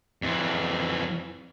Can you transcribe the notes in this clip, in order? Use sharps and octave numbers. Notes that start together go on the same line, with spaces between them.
F2 E3